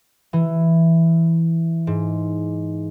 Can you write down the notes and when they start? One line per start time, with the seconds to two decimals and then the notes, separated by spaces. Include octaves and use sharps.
0.33 E3
1.87 G#2